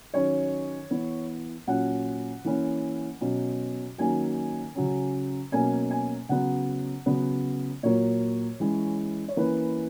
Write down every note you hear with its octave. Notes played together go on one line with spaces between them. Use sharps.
D#3 F#3 C#4 C#5
E3 B3
A#2 F#3 C#4 F#5
E3 A#3 C#4
B2 F#3 C#4
D#3 F#3 A#3 C#4 G#5
C#3 F#3 C#4
B2 F#3 A#3 C#4 G#5
G#5
C#3 F#3 B3 F#5
C#3 F#3 B3
A#2 F#3 A#3 C#5
E3 G#3 C#4
C#5
E3 A#3 C#4 B4